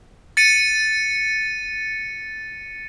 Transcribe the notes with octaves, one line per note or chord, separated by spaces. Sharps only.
A6 C#7 D#7